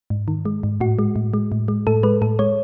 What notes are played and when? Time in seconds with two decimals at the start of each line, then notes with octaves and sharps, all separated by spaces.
0.10 G#2
0.28 D#3
0.45 G#3
0.63 G#2
0.81 A2 F#4
0.99 G#3
1.16 A2
1.34 G#3
1.52 A2
1.68 G#3
1.87 A2 A4
2.03 G#3 B4
2.22 A2 A4
2.39 G#3 C#5